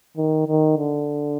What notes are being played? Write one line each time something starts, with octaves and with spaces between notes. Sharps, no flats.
D#3
D#3
D3